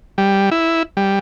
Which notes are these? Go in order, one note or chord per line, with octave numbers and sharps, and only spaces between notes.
G3
E4
G3